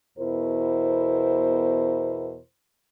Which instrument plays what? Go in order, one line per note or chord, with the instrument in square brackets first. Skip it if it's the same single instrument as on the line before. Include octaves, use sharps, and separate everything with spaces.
[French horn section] E2 B2 E4 A#4 C5